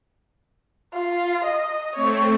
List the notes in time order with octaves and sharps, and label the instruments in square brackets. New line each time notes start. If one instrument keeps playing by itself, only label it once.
[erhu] F4
D#5
[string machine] A3 C4 [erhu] C#5